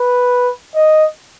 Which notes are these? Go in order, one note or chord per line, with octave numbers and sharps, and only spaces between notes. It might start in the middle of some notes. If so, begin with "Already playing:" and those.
Already playing: B4
D#5